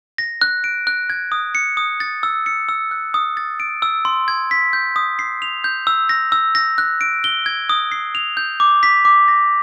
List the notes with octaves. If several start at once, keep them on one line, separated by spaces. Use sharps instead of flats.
A#6
F#6
D7
F#6
G#6
D#6
C#7
D#6
A6
E6
C#7
E6
F#6
D#6
A6
D7
E6
C6
G#6
B6
G6
D#6
C7
F7
G6
E6
A#6
E6
A#6
F#6
D7
G7
G#6
D#6
C7
F7
G6
D6
B6
D6
A#6